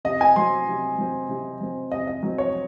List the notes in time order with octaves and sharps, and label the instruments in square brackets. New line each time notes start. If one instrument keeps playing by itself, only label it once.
[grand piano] C3 D#5
G#5
F#3 C4 C6
C3
F#3 C4
C3
F#3 C4
C3 D#5
D#5
F#3 C4
C#5